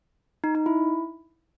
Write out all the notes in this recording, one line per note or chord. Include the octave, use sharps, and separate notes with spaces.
D#4
D#4
E4